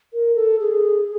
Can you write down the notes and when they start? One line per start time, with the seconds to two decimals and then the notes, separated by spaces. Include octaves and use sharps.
0.13 A#4
0.36 A4
0.60 G#4